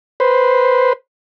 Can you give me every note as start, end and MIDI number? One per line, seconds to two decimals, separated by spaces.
0.20 0.93 71
0.20 0.93 72